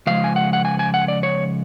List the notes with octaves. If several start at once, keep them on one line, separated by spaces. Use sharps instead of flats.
C#3 F3 G#3 F5
G#5
F#5
F#5
G#5
G#5
F#5
D5
C#5